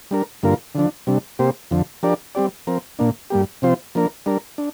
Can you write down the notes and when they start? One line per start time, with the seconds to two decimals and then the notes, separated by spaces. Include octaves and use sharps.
0.11 G3 D4 A#4
0.43 G2 D3 A#3 F4 A#4
0.75 D3 F3 D4
1.07 C3 G3 D4
1.39 C3 A#3 G4 C5
1.71 F2 D3 F3
2.03 F3 D4 G4 A#4 D5
2.35 G3 C4 G4 D5
2.67 F3 C4 A#4
2.99 A#2 A#3 D4
3.30 G2 G3 A#3 G4
3.62 C3 F3 C4 F4 C5
3.95 F3 A#3 D4 A#4
4.26 G3 D4 A#4
4.58 D4